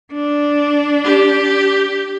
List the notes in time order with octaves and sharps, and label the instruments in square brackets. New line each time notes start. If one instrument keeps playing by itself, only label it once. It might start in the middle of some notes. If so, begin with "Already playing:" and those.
[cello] D4
[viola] G4